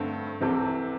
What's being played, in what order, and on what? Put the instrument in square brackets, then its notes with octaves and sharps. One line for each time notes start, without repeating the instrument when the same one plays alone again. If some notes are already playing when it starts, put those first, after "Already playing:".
Already playing: [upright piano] G2 D3 A3 C4
C2 C3 E3 C4 A4